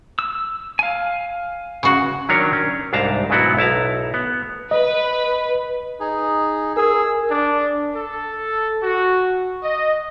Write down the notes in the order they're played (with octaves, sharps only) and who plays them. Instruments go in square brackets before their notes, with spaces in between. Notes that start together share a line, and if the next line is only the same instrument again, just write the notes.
[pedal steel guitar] E6
F5 G#5
[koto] C#3 F#4
[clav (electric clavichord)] D#3 F#3 C#4 D4 A#4 C#5
C#4
C2 G#2 D4 F5 A5 A#5
G#2 B2 F#3 B3 E4 F#4
B1 E4 A5 A#5
B3
[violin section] B4 [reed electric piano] D#5
[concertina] D#4 G#4
[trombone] G#4 [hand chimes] A#4 [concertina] E6
[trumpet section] D4
A4
F#4
D#5